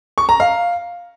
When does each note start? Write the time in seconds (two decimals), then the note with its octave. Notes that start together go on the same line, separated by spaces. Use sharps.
0.18 C#6
0.29 A#5
0.40 F5